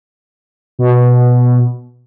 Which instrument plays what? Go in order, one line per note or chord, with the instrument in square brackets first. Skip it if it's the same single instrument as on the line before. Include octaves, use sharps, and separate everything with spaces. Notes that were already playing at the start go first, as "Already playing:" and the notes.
[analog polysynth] B2